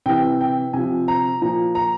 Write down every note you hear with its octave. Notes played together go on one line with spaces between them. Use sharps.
C3 E3 G5
G5
C3 F3 G#5
A#5
A#2 F3 A#5
A#5